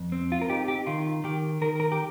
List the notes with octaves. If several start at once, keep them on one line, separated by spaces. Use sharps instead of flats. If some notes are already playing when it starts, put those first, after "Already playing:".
Already playing: F2
C4
F4
A#4
D#4 G4
G4
D#3 F4
D#3 G4
D#3 A#4
A#4
G4